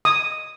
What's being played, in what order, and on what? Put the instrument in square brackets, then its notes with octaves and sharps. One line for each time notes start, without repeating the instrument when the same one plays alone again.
[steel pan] D#6